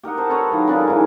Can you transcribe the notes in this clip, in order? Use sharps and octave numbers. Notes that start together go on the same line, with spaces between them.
G4 A#4 D#5 F#5
C5 A5
A4 B4 C#5 A#5
D#3 F#3 F4 A#4
C#3 D4 G#4 A#4
G#2 E3 A5